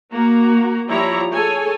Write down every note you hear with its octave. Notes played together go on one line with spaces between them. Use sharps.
A#3 F#4 A#5
F3 G3 E4 C#5 A#5
G#4 A4 C#5 G#5